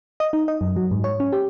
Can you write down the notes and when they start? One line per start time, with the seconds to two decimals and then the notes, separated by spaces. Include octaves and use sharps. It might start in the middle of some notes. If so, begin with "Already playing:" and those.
0.20 D#5
0.33 D#4
0.48 D#5
0.61 F#2
0.76 F#3
0.91 G#2
1.04 C#5
1.20 C#4
1.32 G4